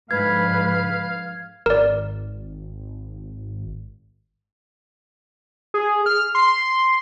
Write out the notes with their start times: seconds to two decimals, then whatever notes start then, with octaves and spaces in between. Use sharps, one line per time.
0.11 G#2 D3 F3 B4 F5 G#6
1.66 G#1 A#4 D5
5.74 G#4
6.06 F6
6.35 C6